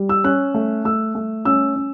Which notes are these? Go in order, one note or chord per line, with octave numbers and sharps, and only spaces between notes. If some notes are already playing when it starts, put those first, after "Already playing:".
Already playing: G3
E6
C#4 F#6
A3
A3 E6
A3
C#4 E6
C#4